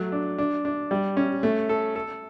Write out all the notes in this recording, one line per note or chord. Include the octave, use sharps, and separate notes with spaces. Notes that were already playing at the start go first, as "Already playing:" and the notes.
Already playing: F#3 A3
D4
D4
D4
G3
C#4
A3
A4
A4